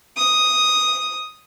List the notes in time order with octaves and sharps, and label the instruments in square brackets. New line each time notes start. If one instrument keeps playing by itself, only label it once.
[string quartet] D#6